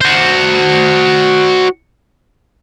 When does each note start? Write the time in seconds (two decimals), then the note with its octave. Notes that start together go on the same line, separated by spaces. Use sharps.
0.01 F#4 C5